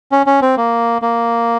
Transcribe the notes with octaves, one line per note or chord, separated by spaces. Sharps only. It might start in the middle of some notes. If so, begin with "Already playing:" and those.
C#4
C#4
C4
A#3
A#3